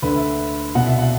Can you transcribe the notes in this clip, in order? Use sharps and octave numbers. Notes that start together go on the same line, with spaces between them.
D2 D3 B4
E5
C2 B2 F#5
E5
F#5